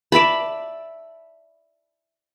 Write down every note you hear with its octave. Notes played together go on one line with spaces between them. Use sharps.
D5 E5 A5 B5